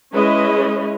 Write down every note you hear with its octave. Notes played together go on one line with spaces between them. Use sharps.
G#3 C#4 E4 B4 C#5 D#5